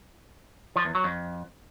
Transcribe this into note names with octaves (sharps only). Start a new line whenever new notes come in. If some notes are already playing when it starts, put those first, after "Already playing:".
F3
E2
F#3
F2